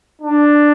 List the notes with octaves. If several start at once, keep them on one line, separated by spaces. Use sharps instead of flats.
D4